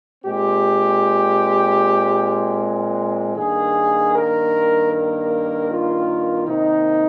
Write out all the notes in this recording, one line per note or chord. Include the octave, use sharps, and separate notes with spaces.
A#2 G#3 C4 G4
G2 D#3 A#3 G#4
A#4
A#4
F4
C3 D#3 A#3 D#4